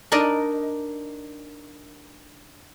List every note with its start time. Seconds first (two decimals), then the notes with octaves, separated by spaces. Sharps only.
0.12 D4 D#4 A#4 D5 D#5